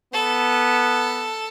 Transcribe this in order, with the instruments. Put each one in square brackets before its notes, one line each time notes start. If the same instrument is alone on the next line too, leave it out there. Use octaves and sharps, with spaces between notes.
[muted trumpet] B3 [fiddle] A4